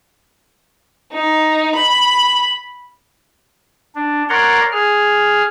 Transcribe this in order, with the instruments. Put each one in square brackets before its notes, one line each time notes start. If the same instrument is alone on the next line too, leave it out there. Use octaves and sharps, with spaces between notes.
[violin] D#4
B5
[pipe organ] D4
A#4 C#5 D5 F#5 A#5 C6
G#4 F6